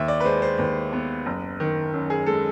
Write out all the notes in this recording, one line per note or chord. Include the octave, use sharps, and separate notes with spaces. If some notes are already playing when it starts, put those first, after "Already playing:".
Already playing: D#2 E5
D5
B4
G#3 C5
C5
D#2 B4
B3
F#1
D#3
F#2
G#4
G#3 A4